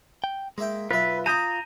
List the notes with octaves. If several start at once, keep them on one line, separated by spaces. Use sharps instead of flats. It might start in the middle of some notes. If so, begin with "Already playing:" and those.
G5
G#3 A#3 E5 G5
B1 F4 B4 E5
A#5 B5 D6 D#6 G6 D#7